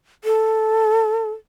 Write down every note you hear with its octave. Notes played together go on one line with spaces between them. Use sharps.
A4